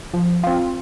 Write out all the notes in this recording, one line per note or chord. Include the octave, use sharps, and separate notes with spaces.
F3
C4 F4